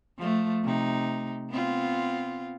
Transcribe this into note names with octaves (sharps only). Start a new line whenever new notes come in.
F3 A3
C3 D#4
B3 C4 F4